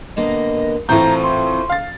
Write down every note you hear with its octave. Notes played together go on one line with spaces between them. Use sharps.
D3 A#3 B3 D#5
A2 E3 C4 F4 A4 A#5 G6
C6
F5 A6